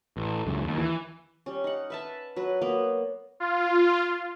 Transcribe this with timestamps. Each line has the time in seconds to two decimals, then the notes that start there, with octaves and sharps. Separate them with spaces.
0.17 A1
0.46 C#2 F#2
0.64 D#2
0.78 E3
1.46 G3 C#4
1.64 D#4 F#5
1.90 B4 E5 A5
2.36 F#3 B4
2.61 F#3 A#3 B3
3.40 F4